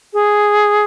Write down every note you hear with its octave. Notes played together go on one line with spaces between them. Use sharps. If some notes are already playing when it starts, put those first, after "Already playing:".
G#4